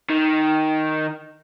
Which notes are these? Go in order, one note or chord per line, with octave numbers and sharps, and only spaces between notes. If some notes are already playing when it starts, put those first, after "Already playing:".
D#3